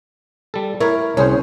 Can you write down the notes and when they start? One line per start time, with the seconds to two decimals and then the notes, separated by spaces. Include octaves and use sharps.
0.54 G3 A4
0.81 E4 A#4 C#5 E5
1.17 C2 C#4 G#4 C5